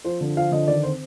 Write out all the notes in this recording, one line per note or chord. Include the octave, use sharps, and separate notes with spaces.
F3 C5
D3
F3 F5
D3 D#5
D#3 D5
C4 C5